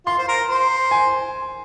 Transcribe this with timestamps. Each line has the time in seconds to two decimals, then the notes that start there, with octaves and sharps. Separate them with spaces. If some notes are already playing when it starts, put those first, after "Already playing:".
0.06 F4 C6
0.18 C5
0.28 A#4
0.49 C5
0.91 G#5